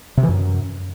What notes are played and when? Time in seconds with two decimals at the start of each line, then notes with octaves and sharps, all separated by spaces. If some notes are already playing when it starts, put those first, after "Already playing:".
0.17 C3
0.23 E3
0.29 F#2